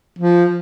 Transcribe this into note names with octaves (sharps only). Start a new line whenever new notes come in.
F3